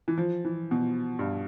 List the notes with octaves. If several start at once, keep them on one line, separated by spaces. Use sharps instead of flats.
E3
F3
E3
B2
G2